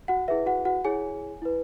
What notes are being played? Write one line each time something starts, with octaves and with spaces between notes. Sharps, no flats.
F#4 F#5
E4 G#4 B4 E5
F#4 F#5
F#4 F#5
E4 G#4 C#5 G#5
E4 B4